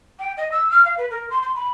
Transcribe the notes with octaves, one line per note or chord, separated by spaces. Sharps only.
G5
D#5
E6
F6
F5
B4
A#4
C6
C6
B5